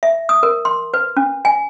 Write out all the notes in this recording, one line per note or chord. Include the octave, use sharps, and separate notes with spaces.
E5
D#6
A#4
C6
B4
C#4
G#5